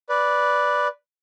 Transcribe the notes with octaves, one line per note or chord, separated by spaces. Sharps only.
B4 D5